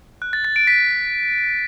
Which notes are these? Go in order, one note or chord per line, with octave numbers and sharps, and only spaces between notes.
F#6
A6
A6
D7
B6